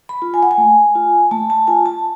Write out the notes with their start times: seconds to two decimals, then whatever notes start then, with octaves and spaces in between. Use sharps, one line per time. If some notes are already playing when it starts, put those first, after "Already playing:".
0.09 B5
0.22 F4
0.34 G#5
0.43 F#5
0.51 G#5
0.58 A3
0.95 F4
1.31 A3 A5
1.50 A5
1.67 F4 G#5
1.86 A5